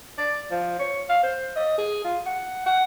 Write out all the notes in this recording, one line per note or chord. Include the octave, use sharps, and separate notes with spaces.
D5
F3
C#5
F5
C5
D#5
G#4
F4
F#5
F#5